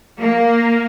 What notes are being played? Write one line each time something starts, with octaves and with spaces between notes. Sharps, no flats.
A#3